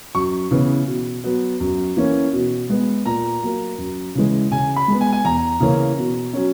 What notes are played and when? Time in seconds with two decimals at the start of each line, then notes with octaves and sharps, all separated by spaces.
0.15 F#2 C#6
0.51 C#3 E3 B3
0.87 B2
1.24 F#3 B3
1.60 F#2
1.97 E3 A#3 C#4
2.33 B2
2.70 G#3 B3
3.06 A#2 A#5
3.42 F#3 A#3
3.78 F#2
4.15 C#3 E3 G#3
4.51 C#3 G#5
4.76 B5
4.88 G#3 B3
5.01 G#5
5.13 G#5
5.25 E2 A#5
5.60 C#3 E3 A#3 C#4
5.98 B2
6.33 F#3 C#4